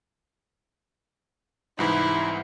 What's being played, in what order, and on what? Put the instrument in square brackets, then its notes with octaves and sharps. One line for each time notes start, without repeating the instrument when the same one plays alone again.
[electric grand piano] C2 G#2 E3 [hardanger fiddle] E4